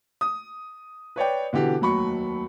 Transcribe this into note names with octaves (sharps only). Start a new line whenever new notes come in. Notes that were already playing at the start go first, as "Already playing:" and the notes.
D#6
B4 C#5 D5 G5
B2 D3 E3 G4
F1 D#2 F#3 B5 C#6